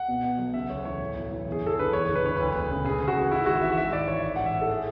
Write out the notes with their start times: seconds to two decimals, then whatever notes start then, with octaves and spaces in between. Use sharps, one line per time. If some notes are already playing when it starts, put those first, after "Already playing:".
Already playing: F#5
0.08 B2
0.24 B2
0.39 B1
0.54 C#3 E5
0.69 D2 C#5
0.85 E3 C#5
1.00 A2
1.16 B1
1.32 E3
1.46 E2
1.52 G#4
1.63 F#1 A4
1.77 D3 B4
1.92 E2 C#5
2.08 F#1
2.15 B4
2.23 D3 C#5
2.36 D2 B4
2.54 E1
2.70 C#3
2.84 C#3 G#4
3.00 D2
3.08 F#4
3.16 E3
3.31 G#2 E4
3.46 G#1 F#4
3.62 E3 E5
3.78 G#2 E5
3.92 G#1 D5
4.08 E3 C#5
4.23 A2
4.36 A1 F#5
4.46 E5
4.55 E3
4.61 A4
4.69 G#4